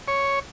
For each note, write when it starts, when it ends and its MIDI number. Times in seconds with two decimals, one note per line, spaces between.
0.08 0.39 73